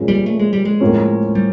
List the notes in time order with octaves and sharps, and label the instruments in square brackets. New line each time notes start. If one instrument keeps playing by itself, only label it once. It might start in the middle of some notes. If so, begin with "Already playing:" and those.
Already playing: [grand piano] A#2 F3 G#3 C#4
[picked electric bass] G3
A3
G#3
G3
G#3
[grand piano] A2 F3 A#3 C#4
[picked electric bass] G3